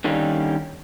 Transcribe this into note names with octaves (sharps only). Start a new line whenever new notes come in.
D3 D#3 G3 A#3 C#4 D#4